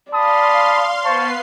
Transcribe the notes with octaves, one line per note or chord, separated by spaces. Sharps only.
D5 F5 A5 B5 C6 D#6
B3 B4 C5 A5 C#6 C7